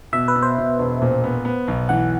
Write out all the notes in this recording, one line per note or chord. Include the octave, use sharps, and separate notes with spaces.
B2 E5
B4
B2
C5
B2
E1
A#2
B3
B3
B1
E3 F#5